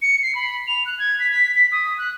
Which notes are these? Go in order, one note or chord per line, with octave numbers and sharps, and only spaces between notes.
C#7
C7
B5
F7
F#6
G#6
B6
B6
B6
D#6
F#6